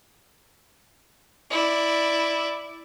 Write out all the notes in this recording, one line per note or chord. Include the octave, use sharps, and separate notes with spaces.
E4 D5